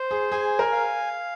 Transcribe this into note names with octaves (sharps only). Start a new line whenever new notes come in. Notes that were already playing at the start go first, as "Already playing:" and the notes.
Already playing: C5
G#4
G#4 G#5
A#4
F5